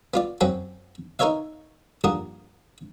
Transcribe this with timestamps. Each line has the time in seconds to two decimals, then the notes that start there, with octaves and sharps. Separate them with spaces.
0.14 B3 F4 D5
0.41 F#2 C4 C#4 F#5 G5
1.19 D#4 A#4 B4 C#5 E5 F5
2.04 A#1 G2 A#4 F#5 D#6